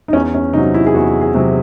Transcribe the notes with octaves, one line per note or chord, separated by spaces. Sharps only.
D#4
E2 C#4
C#4
C3 F#3 D#4
E4
G#4
E2 F#4
G#4
C3 F#3